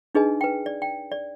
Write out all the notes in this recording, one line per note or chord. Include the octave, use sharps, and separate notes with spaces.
D4 D#4 G#4 B4 D#5 G#5
B4 G5
D5
G5
D5